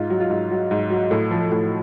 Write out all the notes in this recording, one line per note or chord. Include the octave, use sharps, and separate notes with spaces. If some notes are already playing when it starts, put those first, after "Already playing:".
Already playing: G#2 F4
F#3
F4
G#2
F#3
G#2
F#3
A2
F3
A2